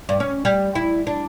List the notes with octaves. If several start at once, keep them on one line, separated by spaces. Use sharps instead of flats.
G2
C#4
G3
E4
D4